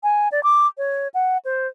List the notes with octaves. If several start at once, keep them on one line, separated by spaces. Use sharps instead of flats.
G#5
D5
D6
C#5
F#5
C5